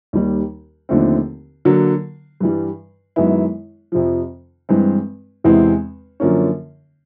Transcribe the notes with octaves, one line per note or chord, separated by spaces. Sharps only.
D#2 D#3 G3
D#2 D3 F3 A3 C4
D3 F#3 A#3
G2 E3 G3
F#2 D#3 G#3 B3 E4
F2 C3 F3
G2 E3 G#3 C4
E2 C3 E3 G#3 C4
F#2 D3 F3 A#3 C#4